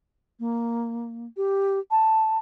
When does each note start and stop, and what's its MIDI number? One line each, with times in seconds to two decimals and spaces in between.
0.40 1.26 58
1.37 1.79 67
1.91 2.38 81